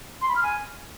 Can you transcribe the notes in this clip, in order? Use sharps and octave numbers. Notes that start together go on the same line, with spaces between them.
C6
B5
F6
G#5